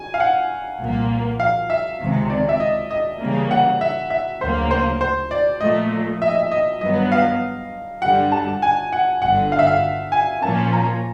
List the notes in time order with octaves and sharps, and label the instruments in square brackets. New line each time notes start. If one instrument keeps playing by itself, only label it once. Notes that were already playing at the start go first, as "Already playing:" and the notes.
Already playing: [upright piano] G#5
F5
F#5
[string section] C2 A#2 F3 A#3
[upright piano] F5
E5
[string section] C#2 C3 D#3 G#3
[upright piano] D5
E5
D#5
D#5
[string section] C#3 E3 G3 A#3
[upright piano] F#5
E5
E5
[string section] D2 C#3 F#3 A#3 [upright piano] C5
[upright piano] C5
C5
D5
[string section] A#2 F3 A3 [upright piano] D#5
[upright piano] E5
D#5
E5
D#5
[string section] G2 D#3 F#3 B3 [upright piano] D#5
[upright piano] F5
[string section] G2 D3 G3 [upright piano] F#5
[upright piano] A5
G#5
F#5
[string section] G1 G2 D3 [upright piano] F#5
[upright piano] F5
E5
F5
G#5
[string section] A#2 F3 A#3 C#4 [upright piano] A5
[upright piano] A#5